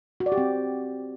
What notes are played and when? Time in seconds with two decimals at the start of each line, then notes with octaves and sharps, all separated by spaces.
0.20 F#4
0.26 D5
0.32 G4
0.38 C4